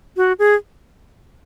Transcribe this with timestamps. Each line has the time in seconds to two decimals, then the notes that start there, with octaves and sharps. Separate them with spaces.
0.17 F#4
0.39 G#4